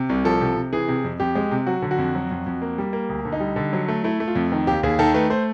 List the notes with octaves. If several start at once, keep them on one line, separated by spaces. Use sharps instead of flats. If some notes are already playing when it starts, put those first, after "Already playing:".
Already playing: C3
C2
F3 A4
C3
C3
E3 G#4
C3
F2
F2 G4
G#3
C3
F#3 F#4
D3
F#4
F2
F#3
F2
F2
A#3
G3
A#3
D2
D3
D#4
G3
D3
F#3
A3
A3 E4
A3
F4
F2
D#3
D#2 G4
D#2 G#4
D#3 A4
A3 B4
A3 C5